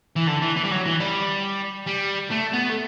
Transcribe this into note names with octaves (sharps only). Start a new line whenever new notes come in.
E3
D3
E3
E3
G3
F#3
E3
G3
G3
A3
B3
A3